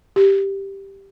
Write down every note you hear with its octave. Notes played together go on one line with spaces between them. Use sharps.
G4